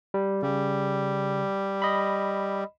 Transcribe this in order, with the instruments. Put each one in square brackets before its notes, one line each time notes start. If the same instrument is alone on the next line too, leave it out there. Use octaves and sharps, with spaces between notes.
[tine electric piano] G3
[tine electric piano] C#3 [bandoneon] G3
[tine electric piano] D#5 B5